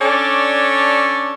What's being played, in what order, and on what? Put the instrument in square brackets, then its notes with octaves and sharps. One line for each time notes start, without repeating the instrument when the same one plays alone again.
[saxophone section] C#4 D4 A4 C#5 D5